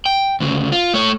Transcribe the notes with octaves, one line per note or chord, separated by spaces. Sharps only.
G5
D2 C#3
F4
A3 C#5